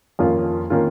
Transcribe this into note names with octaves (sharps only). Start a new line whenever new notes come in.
F2 D#3 A#3 C#4 F4
D#3 A#3 C#4 F4